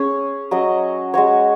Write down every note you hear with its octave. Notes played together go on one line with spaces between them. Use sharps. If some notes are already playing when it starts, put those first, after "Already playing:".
Already playing: C#4 G#4 C#5
F#3 C#4 F#4 D#5
G#3 F#4 C#5